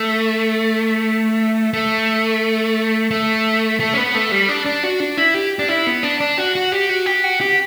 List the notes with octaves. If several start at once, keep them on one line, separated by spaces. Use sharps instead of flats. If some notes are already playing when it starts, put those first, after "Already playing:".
Already playing: A3
A3
A3
A3
C#4
B3
A3
G3
D4
D4
F#4
D4
E4
G4
D4
E4
B3
D4
D4
F#4
F#4
G4
F#4
G4
F#4
G4